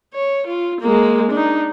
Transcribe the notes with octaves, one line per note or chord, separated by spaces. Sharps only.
C#5
F4
G#3 A#3
D4 D#4